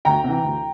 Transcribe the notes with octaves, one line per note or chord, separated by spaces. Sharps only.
D2 G5 A#5
C3 E3
D2